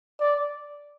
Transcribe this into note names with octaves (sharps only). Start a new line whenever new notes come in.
D5